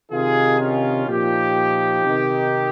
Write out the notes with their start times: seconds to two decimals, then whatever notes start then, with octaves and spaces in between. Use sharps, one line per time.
0.11 C3 D#3 F4 G#4
0.59 C#4 F4
1.07 A#2 F3 D#4 G4
2.04 C3 D#3